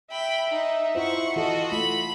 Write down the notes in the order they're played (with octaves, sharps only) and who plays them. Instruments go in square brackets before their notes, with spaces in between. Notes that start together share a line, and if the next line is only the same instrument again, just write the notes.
[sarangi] E5 [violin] G5 B5
[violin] D#4
[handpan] E4 F4 C5 [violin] F#5 C#6
[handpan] E3 F4 A4 [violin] F#4 D#5
[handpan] A3 F4 [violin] B5